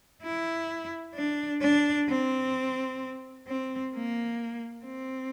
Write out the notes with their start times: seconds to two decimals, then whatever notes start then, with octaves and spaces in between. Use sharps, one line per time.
0.23 E4
1.15 D4
1.61 D4
2.09 C4
3.47 C4
3.93 A#3
4.85 C4